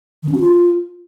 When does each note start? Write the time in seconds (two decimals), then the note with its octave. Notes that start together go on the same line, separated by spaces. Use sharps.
0.23 D#3
0.29 C#4
0.34 F#4
0.40 F4